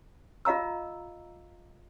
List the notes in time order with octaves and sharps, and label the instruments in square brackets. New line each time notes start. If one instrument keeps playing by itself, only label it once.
[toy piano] F4 D#5 F5 A#5 E6